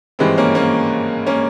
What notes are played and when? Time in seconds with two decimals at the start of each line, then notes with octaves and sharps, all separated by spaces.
0.19 G#1 G2 E3 G#3 C4
0.38 A#3 C#4
0.55 A#3 C#4
1.27 A#3 C#4